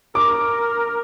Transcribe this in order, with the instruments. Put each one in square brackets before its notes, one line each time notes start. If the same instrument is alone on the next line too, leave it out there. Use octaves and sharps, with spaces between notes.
[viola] A#4 [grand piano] D6